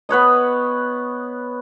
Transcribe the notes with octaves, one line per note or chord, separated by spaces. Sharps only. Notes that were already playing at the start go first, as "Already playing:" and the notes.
B3 B4 C#5 D#5